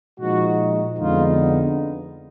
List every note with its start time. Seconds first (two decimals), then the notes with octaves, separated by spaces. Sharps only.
0.20 A#2 F3 G#3 D#4 F#4
0.99 F2 D3 G#3 B3 D#4 F4